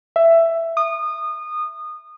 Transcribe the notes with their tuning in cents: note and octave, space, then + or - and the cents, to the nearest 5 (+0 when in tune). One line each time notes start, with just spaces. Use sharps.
E5 +10
D#6 -25